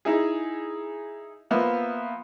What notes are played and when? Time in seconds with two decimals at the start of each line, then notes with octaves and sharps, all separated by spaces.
0.05 D#4 E4 G#4
1.51 F3 A#3 B3 E5